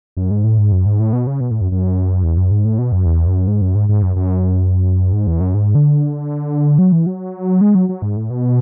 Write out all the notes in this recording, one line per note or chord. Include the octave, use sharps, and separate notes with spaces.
F#2
G#2
A2
G#2
F#2
G#2
A2
B2
C#3
B2
A2
F#2
F#2
E2
F#2
G#2
A2
B2
F#2
E2
F#2
G#2
F#2
G#2
G#2
F#2
F#2
G#2
E2
F#2
G#2
D3
F#3
E3
F#3
G#3
F#3
F#3
G#2
A2
B2